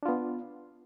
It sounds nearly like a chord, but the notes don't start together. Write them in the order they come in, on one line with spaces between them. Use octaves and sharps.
D4 F4 B3